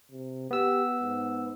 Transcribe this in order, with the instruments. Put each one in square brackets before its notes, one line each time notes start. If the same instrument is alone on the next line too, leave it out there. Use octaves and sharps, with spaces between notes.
[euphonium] C3
[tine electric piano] B3 E6 [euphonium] G4
[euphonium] G#2